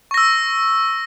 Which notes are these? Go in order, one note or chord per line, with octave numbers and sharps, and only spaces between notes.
C#6 E6 A#6